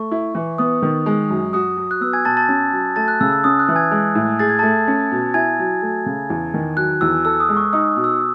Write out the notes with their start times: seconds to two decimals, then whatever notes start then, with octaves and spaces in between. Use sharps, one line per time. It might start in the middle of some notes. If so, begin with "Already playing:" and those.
Already playing: A3 C#6
0.11 E4
0.35 E3
0.58 B3 D#6
0.82 D#3
1.06 G#3
1.30 F#2
1.53 F#4 D#6
1.77 F#3
1.91 F#6
2.01 B3 E6
2.13 G#5 G#6
2.25 B2 A5 A6
2.37 A5 A6
2.49 C#4
2.73 F#3
2.96 A3 A5 A6
3.08 F#6
3.21 C#3 E6
3.32 E6
3.44 C#4 D#6
3.59 F#6
3.68 E3
3.76 G#5 G#6
3.91 G#3
4.15 A2
4.39 G#4 A6
4.49 G#6
4.59 A3 A5 A6
4.88 C#4
5.11 B2
5.34 E4 G#5 G#6
5.59 F#3
5.82 A3
6.06 C#3
6.30 E2
6.54 D#3
6.77 F#3 F#6
7.01 E2 E6
7.25 A4 E6
7.40 D#6
7.49 G#3
7.57 C#6
7.73 D#4 D#6
7.96 B2
8.04 E6